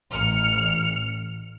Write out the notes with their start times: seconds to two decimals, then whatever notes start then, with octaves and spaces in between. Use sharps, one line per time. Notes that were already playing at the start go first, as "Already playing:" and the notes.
0.12 A1 F6 C#7